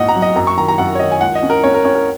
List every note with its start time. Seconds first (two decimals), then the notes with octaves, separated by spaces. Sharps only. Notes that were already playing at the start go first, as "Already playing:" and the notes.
Already playing: A#1 G#2 D#5 F#5
0.08 A#5
0.15 F#3
0.22 D#5
0.36 F#2 A#5
0.47 C#6
0.57 D#3 A#5
0.68 A#5
0.78 F#2 F#5
0.95 C#5
0.99 D#3 D#5
1.12 G#5
1.21 C#2 F#5
1.35 D#5
1.42 C#4
1.50 A#4
1.64 C#4 C#5
1.74 A#4
1.85 C#4 C#5
1.95 A#4